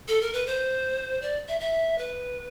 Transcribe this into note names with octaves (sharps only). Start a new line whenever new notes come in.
A4
A#4
B4
C5
D5
E5
E5
B4